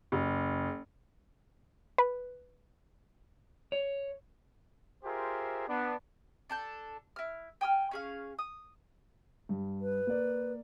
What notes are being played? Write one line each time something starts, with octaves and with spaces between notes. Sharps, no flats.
F#1
B4
C#5
F4 G4 G#4 A#4 C5 E5
B3 D4
D4 A4 G6
E4 F6
G5 G#5 D#6 F6
C#4 G#4 F5
D#6
G2
B4
A#3 D5